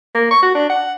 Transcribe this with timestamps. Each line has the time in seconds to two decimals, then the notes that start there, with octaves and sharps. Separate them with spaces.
0.15 A#3
0.31 C#6
0.43 F#4
0.55 D4
0.70 F#5